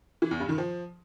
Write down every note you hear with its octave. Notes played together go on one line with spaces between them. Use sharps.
E3
E2
G2
D#3
F3